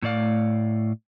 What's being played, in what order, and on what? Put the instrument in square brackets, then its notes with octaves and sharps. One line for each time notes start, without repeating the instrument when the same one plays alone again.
[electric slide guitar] A2 A3 D5 F5